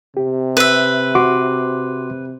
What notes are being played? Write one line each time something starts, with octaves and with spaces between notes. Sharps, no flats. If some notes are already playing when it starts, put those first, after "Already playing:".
C3 G4
B4 E5
F#4 C6 D6